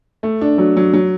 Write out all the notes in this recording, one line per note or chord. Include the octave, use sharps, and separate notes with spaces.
A3
D4
F#3
F#3
F#3